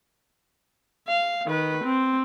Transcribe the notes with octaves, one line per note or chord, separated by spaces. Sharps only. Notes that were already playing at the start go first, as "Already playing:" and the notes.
F5
D#3 B4
C4